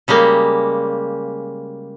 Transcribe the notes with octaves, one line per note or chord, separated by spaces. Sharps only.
C#3 G3 G#3 A#3